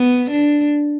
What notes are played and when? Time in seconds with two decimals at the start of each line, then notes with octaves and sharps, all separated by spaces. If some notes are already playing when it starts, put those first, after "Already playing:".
Already playing: B3
0.31 D4